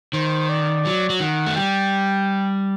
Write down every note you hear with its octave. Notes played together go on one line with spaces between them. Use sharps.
D#3 C5
D5
F#3
F#3
D#3 F#5
A3
G3 G5